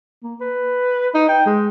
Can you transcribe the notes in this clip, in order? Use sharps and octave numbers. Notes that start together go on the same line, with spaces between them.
A#3
B4
D#4
G5
G#3